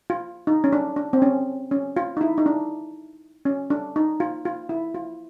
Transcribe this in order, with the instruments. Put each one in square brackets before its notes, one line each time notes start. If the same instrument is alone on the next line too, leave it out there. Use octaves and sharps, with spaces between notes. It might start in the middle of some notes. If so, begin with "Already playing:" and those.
[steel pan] F4
D#4
C#4
D4
D4
C4
C#4
C#4
F4
D#4
E4
D#4
D4
C#4
D4
D#4
F4
F4
E4
F4